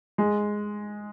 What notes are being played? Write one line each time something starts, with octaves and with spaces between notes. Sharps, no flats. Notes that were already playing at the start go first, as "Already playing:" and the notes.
G#3